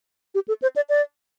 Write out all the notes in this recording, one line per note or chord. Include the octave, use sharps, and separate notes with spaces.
G4
A4
C5
D5
D5